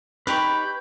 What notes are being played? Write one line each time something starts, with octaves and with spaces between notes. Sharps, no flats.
D#4 G4 B4 C#5 B5 G6